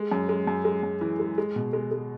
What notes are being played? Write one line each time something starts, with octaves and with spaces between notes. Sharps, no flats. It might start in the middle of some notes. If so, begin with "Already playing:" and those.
Already playing: G#3
F#2
G#3
F#2
G#3
F#2
E3
G#3
G#3
B2
G#3
G#3